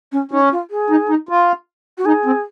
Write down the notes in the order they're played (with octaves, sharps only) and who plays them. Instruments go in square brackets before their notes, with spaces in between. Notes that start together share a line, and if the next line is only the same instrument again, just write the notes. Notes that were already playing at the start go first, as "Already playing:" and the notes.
[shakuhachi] C#4
[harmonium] C#4 [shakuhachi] D#4
[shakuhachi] F4
G#4
[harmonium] D#4
D#4
F4
[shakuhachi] F#4
[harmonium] D#4 [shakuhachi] G#4
[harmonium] C4